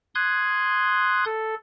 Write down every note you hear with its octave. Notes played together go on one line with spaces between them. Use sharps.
C6 D#6 F#6 G#6
A4